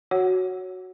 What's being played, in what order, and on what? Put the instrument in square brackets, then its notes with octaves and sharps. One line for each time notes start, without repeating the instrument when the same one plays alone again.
[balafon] F#4 C#5 F#5